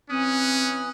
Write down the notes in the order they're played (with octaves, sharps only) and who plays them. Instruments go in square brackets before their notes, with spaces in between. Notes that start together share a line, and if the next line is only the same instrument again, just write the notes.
[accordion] E3 D#6 F#6 [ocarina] C4 [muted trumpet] C#4